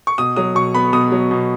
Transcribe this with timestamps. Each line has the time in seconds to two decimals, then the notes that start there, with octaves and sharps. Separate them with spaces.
0.07 C#6
0.18 B2 D#6
0.36 F#3 D#6
0.55 B2 C#6
0.74 B3 B5
0.93 B2 D#6
1.12 F#3
1.31 B2